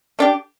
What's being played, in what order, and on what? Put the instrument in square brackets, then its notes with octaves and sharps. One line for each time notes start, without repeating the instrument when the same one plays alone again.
[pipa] A3 D4 G4